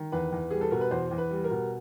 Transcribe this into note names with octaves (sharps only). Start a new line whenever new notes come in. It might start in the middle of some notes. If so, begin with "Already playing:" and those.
Already playing: D#3
E2 B4
E2
G3 G#4
A4
B2 A#4
B4
E2 C5
E2
B4
G3
A#4
B2